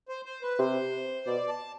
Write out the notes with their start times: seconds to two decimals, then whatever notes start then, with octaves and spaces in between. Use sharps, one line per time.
0.09 C5
0.25 C5
0.42 B4
0.59 C3 C5
1.26 B2 D5
1.49 A5